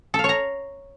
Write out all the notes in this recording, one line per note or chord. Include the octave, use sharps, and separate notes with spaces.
A4
F5
C#5
A#5